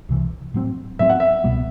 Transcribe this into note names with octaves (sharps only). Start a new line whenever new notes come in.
C2 C3 E3
A2 F#3 C4
A2 F#3 C4 E5
F#5
E5
C2 B2 G3 B3